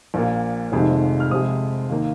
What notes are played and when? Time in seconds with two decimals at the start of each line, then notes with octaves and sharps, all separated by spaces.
0.14 A#1 A#2 A#3
0.72 F1 F2 C3 D#3 G#3
1.20 F6
1.31 F2 C3 G#3 D#6
1.89 D#2 D#3 A#3